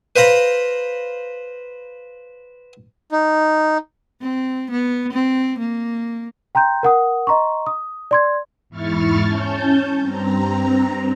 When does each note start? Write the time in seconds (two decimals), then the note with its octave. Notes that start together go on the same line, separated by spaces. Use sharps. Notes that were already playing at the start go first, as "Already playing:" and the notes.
0.16 B4 C5 F5 A#5 B5
3.12 D#4
4.21 C4
4.71 B3
5.13 C4
5.59 A#3
6.55 G5 A#5 C6 G6
6.83 A#4 F#5 D#6
7.27 D#5 A#5 C6 C#6
7.67 D#6
8.11 D5 C6 G#6
8.69 E2 G#2 E4 C#6 F6 A6
9.23 C#4 A5 G6
9.99 G2 C4 A#5